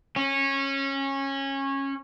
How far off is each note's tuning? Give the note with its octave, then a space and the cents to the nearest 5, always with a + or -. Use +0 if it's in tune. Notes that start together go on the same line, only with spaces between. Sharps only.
C#4 -20